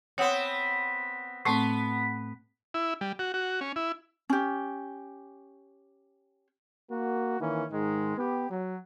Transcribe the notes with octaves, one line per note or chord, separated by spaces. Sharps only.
B3 C4 C#5 F#5 D#6
A2 A3 B3 C4
E4
G3
F#4
F#4
C#4
E4
C#4 G4
A#3 F#4
D#3 E3 A#3 C#4
G#2 D#3 G#3
B3 G4
F#3